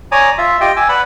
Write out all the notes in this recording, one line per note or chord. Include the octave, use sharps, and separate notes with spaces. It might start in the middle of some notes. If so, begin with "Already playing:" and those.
C#5 D5 G#5 A#5 D6 D#6
F4 E5
F4 G4 D#5 G5
G#5 D6 E6
B4 D5 F#5 B5